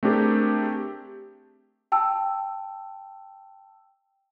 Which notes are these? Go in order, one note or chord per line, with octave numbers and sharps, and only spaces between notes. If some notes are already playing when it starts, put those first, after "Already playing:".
A3 C4 D4 G4 G#4 A#4
G5 A5 E6